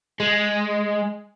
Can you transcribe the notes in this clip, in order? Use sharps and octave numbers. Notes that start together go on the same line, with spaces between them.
G#3